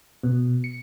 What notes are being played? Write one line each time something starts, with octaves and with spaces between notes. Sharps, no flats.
B2
C#7